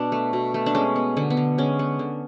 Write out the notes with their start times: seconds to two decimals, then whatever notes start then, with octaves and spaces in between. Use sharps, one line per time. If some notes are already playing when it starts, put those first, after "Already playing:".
Already playing: B2 D4
0.12 A3
0.33 B2
0.54 A3
0.66 D4
0.75 G#3 C#4
0.96 B3
1.17 D3 B3
1.30 B3
1.37 D3
1.58 G#3 C#4
1.79 B3
1.99 D3